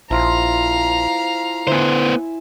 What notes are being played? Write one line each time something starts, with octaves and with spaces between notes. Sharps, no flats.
A#1 F3 E4 F4 F5 A#5
D3 B3 E4 C5 E5 G#5